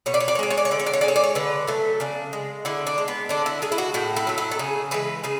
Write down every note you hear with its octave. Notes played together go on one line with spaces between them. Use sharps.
B2 C#5
D5
C#5
D5
C#5
G#3 D5
C#5
D5
C#5
D3 D5
C#5
D5
C#5
G#3 D5
C#5
D5
C#5
D3 B4
F#3 A3 A4
C#3 D4
G#3
D3 E4
D4
G#3
B3
D3 D4
E4
G#3 G#4
E4
F#4
A2 F#4
E4
F#3 A3
E4
A4
C#3 G#4
E3 G#3 B4
C#3 G#4